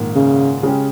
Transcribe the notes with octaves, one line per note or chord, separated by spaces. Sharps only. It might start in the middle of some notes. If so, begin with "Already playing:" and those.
Already playing: A#1 G#2 D#3 A#3
C#3
C#3 G#3 C#4 G4